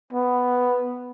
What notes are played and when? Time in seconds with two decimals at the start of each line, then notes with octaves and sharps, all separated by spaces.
0.13 B3